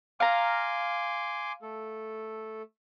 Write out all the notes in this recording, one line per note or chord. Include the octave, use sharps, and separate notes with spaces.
F5 G#5 A#5 C6 D6
A3 A4